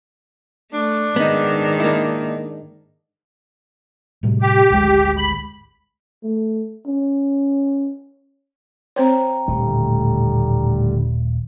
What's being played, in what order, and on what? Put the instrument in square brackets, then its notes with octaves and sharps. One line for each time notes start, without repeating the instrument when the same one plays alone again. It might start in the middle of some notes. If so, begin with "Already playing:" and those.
[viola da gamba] A3 [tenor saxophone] D4
[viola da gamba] G#2 D#3 [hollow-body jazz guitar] B3 D#4
[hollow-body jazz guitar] A#3 E4
[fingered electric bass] A2 C3 G3
[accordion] G4
[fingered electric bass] G#1 D2 G#3
[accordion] B5
[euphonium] A3
C#4
[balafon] C4 C5 C#5 [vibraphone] G5 A#5
[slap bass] D#1 A3 [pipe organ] A2 D3 G3